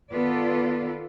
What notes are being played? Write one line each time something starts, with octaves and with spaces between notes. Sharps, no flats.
D#3 B3 F4 A4 B4 D5